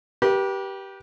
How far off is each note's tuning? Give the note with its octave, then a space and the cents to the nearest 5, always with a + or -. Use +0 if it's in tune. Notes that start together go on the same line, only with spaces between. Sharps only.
G4 -10 B4 -40